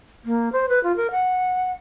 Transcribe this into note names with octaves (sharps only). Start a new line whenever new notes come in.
A#3
C5
B4
F4
A#4
F#5